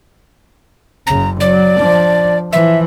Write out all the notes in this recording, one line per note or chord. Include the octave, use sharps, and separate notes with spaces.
F#1 C#3 A#5
F#3 D5
F3 D4
E3 F3 E5